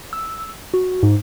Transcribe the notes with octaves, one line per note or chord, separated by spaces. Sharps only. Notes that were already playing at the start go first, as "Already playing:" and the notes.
E6
F#4
G#2